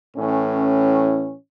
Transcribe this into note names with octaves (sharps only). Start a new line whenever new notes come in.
A2 E3 C#4